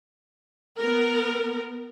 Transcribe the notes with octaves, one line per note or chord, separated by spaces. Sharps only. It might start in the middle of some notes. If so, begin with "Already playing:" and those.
B3 A#4